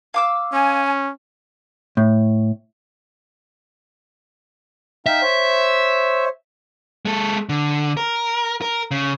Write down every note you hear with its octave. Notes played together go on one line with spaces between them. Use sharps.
F5 D6 E6
C#4 G#5
A2
D#4 E5 F5 G5
C5 C#5
G#3 A4
D3
A#4
A#4
C#3